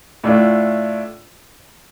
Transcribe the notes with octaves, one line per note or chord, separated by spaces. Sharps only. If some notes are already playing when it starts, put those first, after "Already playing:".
A2 A3 D4 F4